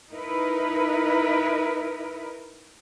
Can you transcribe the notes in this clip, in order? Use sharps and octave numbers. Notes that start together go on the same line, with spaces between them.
D#4 E4 A#4 B4